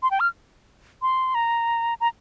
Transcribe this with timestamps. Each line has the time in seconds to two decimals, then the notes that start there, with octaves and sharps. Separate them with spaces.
0.03 C6
0.11 G5
0.20 F6
1.02 C6
1.35 A#5
2.01 A#5